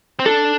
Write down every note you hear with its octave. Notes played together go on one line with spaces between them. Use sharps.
C4
D4 A4